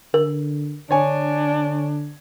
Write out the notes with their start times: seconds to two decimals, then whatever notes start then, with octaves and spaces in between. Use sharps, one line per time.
0.14 D3 A#4
0.91 D3 D4 C#5 G#5